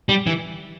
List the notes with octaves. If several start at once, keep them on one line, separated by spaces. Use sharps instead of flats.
G3
E3